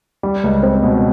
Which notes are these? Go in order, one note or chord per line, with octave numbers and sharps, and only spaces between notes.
G3
C#2
C4
B2